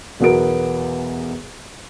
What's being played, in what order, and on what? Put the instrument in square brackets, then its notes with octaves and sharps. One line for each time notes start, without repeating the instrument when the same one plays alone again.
[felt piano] B1 E2 B3 F#4 A#4 D7